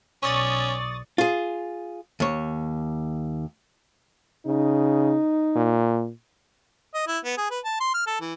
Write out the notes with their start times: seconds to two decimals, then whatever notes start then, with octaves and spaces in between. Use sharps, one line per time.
0.23 B1 C#4 D5 C#6 D#6 A6
1.18 F4 G#4
2.20 D#2 C#5
4.46 C#3 D#4
5.56 A#2
6.94 D#5
7.07 E4
7.25 B3
7.38 G#4
7.51 B4
7.64 A5
7.80 C6
7.94 F6
8.07 A4
8.21 E3